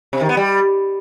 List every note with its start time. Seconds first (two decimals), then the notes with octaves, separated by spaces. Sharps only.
0.13 C3
0.21 D#3
0.29 B3
0.37 G3